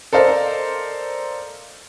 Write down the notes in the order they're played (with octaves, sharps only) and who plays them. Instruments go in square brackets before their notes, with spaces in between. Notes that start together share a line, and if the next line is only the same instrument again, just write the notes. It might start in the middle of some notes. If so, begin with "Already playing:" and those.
[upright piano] A4 A#4 C5 D5 D#5 F5